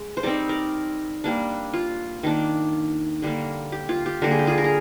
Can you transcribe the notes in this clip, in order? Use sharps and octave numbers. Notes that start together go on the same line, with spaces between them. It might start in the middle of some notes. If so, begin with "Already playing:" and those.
Already playing: G#3
C5
G3 C4 D#4 A#4 D5
A#4 D5
G3 A#3 D4
F4
D#3 A#3 D4
D3 G3 A#3
G4
F4
G4
D3 G3 A#3 A#4
G#4
G4
F4 G#4
A#4
G#4